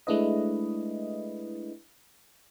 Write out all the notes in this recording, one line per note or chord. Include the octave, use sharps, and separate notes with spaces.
G#3 A3 D4 E4 B4 D#5